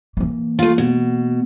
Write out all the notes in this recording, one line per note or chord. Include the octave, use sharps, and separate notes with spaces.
E3 A#3
A3 F4
B2